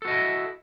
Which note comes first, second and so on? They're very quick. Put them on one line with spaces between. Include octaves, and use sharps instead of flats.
A4 F#4 D#5 E4